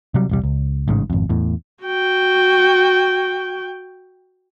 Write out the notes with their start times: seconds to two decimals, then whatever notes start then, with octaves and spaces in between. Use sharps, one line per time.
0.14 C3 F#3 G3
0.29 E1 C2 G3
0.44 C#2
0.88 A1 G#2 C#3
1.10 G#1 F2
1.29 E2 A2
1.84 F#4 G5